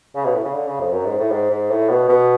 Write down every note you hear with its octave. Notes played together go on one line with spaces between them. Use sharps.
C#3
B2
A2
C#3
D3
C#3
F2
F#2
G#2
A2
G#2
G#2
A2
B2
B2